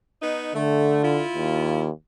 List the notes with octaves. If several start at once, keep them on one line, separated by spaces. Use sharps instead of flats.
B3 D#4
D3 A3
E4 F4
D#2